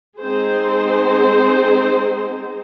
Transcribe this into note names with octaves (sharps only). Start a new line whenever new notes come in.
G#3 C4 D#4 G#4 C5